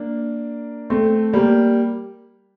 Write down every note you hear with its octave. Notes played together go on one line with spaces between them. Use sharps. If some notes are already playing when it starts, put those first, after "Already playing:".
Already playing: A#3 D4
A3 C4
G3 A#3